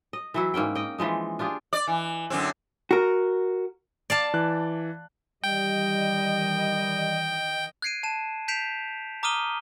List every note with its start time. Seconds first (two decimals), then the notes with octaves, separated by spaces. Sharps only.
0.13 D#5
0.34 E3 F#3 E4
0.54 G#2 A#3 C#4 G5
0.75 D#5 G5
0.98 E3 F3 G#3 D#4
1.39 D4 F4 G4 G#4
1.73 D5
1.88 E3
2.30 F#2 D3 C4
2.91 F#4 A#4
4.10 D5 F5 A5
4.34 E3 F#6
5.44 D#3 E3 G3 D#5 G5
7.82 F#6 G#6 C7 D7 D#7
8.03 A5 D#7 E7
8.48 G6 B6 C7 D7 E7 F7
9.23 A#5 D6 D#6 F6 D#7 G7